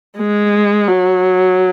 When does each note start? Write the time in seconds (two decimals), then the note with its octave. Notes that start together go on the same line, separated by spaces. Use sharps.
0.18 G#3
0.88 F#3